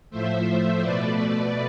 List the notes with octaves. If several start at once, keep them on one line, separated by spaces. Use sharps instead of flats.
A2 F3 A3 C5 E5
B2 A3 B4 D5